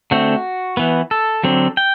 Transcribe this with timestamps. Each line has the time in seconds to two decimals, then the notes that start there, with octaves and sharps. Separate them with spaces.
0.11 D3 A3 C4 F#4
0.77 E3 B3
1.11 A4
1.44 D3 F#3 C4
1.77 G5